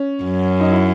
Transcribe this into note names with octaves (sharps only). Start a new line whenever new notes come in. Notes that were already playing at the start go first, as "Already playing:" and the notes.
Already playing: C#4
F#2
D#4
E4